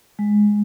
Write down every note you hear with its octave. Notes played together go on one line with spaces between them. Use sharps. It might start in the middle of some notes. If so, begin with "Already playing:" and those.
G#3